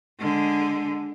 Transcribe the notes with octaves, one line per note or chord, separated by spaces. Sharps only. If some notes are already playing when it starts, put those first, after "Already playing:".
D3 G#3